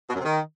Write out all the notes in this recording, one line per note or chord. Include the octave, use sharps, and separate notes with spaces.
B2
F#2
C3
D#3